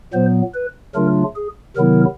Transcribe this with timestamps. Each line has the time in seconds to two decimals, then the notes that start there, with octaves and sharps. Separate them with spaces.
0.13 A#2 F#3 B3 C5
0.54 B4
0.95 C#3 F#3 A3 D4 F4 A#4
1.36 G#4
1.76 C3 D#3 F#3 B3 E4 A#4